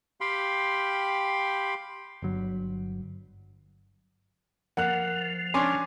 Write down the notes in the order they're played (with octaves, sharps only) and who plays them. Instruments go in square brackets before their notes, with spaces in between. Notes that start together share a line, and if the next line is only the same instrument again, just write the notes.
[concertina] G4 F5 G5 B5 C6
[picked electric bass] G1 F#3
[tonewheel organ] F3 [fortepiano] A#3 [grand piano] F#5 F#6
[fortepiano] C#4 D4 [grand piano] G#5 C6 D6